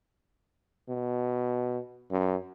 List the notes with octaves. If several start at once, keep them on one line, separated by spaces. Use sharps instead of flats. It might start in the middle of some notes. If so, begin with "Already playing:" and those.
B2
F#2